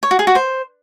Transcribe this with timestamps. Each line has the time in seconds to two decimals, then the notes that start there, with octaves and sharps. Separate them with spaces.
0.03 C#5
0.11 F#4
0.19 G#4
0.27 F#4
0.35 C5